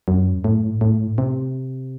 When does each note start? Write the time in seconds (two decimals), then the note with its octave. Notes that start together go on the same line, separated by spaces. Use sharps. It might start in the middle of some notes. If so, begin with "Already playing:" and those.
0.08 F#2
0.44 A2
0.81 A2
1.18 C3